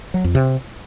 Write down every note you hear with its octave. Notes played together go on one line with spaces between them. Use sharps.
F#3
F2
C3